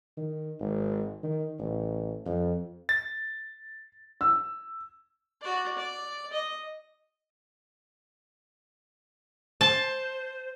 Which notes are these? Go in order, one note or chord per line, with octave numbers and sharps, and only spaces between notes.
D#3
G#1
D#3
A1
F2
A6
E6
F#4 D5
D5
D#5
C5 A5